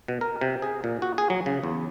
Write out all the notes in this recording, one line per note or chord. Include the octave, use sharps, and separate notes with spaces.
B2
A#4
C3
G#4
A#2
F#4
G#4
F#3
C#3
E2